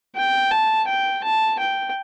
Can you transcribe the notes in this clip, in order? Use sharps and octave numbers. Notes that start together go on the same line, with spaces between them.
G5
A5
G5
A5
G5